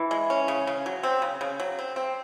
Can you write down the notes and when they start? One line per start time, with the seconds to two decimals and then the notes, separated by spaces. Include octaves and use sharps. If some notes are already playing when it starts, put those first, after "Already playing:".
Already playing: E3
0.11 G#3
0.30 C#4
0.48 C#3
0.67 C#3
0.86 F#3
1.03 C4
1.22 C#3
1.41 C#3
1.60 F#3
1.79 C4
1.96 C4